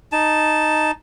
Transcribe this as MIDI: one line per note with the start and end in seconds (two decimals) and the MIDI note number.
0.12 0.91 63
0.12 0.91 81